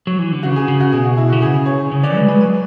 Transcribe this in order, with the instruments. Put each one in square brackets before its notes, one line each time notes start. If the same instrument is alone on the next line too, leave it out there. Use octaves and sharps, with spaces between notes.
[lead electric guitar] F#3
E3
D3
[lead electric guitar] C#3 [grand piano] F#4
[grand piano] G#4
[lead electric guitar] C#3
[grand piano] F#4
[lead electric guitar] B2 [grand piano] G#4
[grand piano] F#4
E4
[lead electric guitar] D3 [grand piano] F#4
[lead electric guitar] C#3 [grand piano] G#4
[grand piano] C#5
[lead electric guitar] C#3
[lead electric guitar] D3 [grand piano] D5
[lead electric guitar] G#3 [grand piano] B4
[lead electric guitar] G#3 [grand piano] B4
[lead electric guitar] F#3 [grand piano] B4